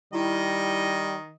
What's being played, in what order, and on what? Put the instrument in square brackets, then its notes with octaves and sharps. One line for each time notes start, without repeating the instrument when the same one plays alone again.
[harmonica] D#3 D#5 [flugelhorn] G3 [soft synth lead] E4